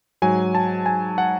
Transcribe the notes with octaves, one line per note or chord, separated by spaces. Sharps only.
G#2 F#3 G#5
A5
G#5
F#5